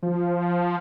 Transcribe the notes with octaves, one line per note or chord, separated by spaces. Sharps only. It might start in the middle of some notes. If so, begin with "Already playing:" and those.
F3